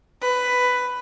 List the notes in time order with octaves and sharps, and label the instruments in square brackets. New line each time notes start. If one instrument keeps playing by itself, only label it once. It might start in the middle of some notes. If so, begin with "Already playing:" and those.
[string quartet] B4